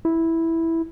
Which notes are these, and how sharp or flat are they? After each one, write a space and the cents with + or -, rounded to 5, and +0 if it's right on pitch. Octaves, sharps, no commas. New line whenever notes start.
E4 -5